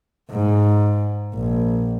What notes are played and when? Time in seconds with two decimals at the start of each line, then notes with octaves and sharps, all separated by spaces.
0.31 G#2
1.35 A#1